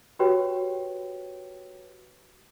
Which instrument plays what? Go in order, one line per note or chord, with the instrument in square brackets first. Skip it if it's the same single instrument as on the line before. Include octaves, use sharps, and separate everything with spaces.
[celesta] F#4 G4 B4 C#5 G5